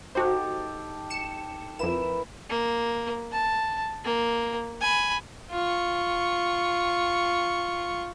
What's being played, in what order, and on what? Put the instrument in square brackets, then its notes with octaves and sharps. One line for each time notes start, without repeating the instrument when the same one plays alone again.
[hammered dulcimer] D#4 G4 A4 [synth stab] F#4 C5
[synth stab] C#7 E7
[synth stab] F2 E7 [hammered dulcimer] E4 A#4 B4
[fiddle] A#3
A5
A#3
G#5 B5
F4 C#6